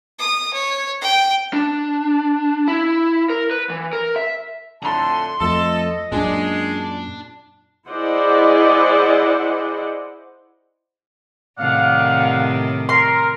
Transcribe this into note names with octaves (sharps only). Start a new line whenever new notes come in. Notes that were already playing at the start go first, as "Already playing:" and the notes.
D#6
C#5
G5
D4
E4
A#4
B4
E3
A#4
E5
F2 A2 D3 A5 A#5 C6
F2 F3 A3 A4 D#5
F#2 A#2 G#3 D4
E4 G#4 C5 D5 D#5 F#5
A2 C3 D#3 D5 F5 F#5
A#4 C6